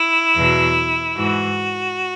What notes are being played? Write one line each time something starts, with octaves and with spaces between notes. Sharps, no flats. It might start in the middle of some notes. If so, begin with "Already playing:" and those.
Already playing: E4
E2 B2 F#3
G#2 E3 F#4